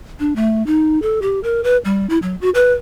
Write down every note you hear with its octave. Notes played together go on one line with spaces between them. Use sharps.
D4
A3
D#4
A4
G4
A#4
B4
G3
E4
F#3
F#4
B4